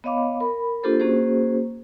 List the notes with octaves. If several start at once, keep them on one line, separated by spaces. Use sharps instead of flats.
B3 C#5 D#5 F5 B5 D6
A#4 B5
A#3 D4 F4 G4 A4 C5
A#3 C#4 F#4 G#4 C5